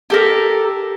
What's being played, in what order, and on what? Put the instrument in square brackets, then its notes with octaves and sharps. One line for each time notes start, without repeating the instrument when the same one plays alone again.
[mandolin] G4 A4 A#4